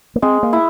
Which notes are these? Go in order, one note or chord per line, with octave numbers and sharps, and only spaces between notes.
A#3
G#3 C4
A#3
E4